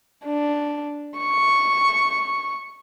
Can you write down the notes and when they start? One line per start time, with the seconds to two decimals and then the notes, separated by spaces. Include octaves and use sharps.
0.25 D4
1.17 C#6